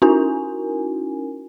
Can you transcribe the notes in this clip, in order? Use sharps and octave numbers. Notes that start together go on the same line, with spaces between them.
C#4 D#4 E4 F#4 A#4 G#5